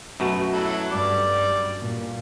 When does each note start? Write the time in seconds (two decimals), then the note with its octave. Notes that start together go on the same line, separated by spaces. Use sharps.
0.20 F#2 B2 A3 F#4
0.53 F#3 E4 A4
0.92 G2 G3 D5 D6
1.79 A#2